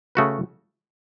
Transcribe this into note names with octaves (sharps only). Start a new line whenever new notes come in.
C#3 A3 F#4 B4